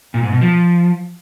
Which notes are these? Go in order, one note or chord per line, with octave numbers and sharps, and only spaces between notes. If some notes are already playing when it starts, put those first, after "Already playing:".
A#2
G#2
B2
F3